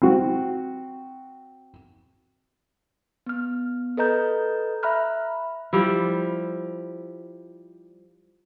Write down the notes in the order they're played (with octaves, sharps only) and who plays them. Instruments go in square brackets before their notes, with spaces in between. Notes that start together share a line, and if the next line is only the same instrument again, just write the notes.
[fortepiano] C4 F#4
[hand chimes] B3 F6
A4 B4 D#5 A#5 G6
E5 A#5 B5 F6 F#6
[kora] F3 G3 E4